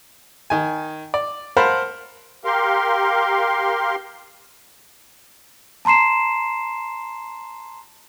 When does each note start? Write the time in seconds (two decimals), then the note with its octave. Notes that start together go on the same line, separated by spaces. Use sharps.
0.50 D#3 G#5
1.14 D5
1.57 A#4 C5 F5 F#5 A5 B5
2.45 G4 A#4 F5 C6
5.85 A5 A#5 C6 C7 E7